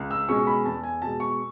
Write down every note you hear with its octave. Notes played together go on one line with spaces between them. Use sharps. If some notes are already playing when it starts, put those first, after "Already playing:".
Already playing: C#2
E6
B2 G#3 C#4 C#6
B5
E2 A5
G#5
B2 G#3 A5
C#6